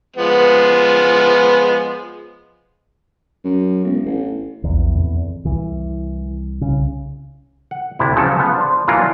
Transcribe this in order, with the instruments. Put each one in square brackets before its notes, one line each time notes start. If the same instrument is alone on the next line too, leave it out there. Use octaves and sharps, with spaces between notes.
[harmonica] F3 G#3 B3
[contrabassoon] F#2
E1
A1
[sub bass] A#1 [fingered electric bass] E2
[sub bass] F2
[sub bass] C2 [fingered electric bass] E3
[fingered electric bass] C#3
[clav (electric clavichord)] F#5
D2 C3 E4
C#3 F3 F#3 A3 G4 A4
F3 B3
D4 C5
E3 F#3 A#3 B3 D4 F4